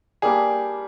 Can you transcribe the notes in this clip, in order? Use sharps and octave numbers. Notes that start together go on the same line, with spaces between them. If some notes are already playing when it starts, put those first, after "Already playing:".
G3 A#3 D4 G4 G#4